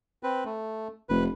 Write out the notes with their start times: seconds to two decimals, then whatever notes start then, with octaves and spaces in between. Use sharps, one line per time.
0.23 C4 B4
0.45 A3
1.09 F1 B4